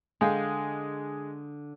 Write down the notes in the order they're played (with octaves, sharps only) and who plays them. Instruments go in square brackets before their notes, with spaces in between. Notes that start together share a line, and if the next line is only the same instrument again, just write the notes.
[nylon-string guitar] D3 F5 G5 [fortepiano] G#3